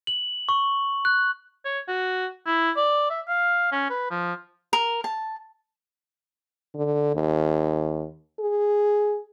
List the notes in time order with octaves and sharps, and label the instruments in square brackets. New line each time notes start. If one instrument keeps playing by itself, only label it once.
[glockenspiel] F#7
C#6
F#6
[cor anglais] C#5
F#4
E4
D5
E5
F5
C#4
B4
F3
[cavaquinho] A#4
A5
[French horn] D3
D#2
G#4